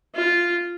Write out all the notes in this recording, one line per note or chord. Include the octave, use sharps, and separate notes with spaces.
F4